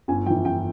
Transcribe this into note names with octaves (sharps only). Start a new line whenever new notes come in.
G1 G#5
F2 E3 G5
G1 G5